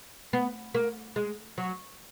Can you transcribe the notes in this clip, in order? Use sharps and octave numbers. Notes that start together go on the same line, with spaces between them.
B3
A#3
G#3
F#3